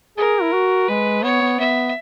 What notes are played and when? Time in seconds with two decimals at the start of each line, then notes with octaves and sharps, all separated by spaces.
0.18 G#4 A#4
0.42 E4
0.53 F#4
0.89 G#3 B4
1.24 B3 C#5
1.41 B3
1.60 B3 E5